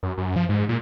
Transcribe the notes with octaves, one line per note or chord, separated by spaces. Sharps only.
F#2
F#2
F3
G#2
A#2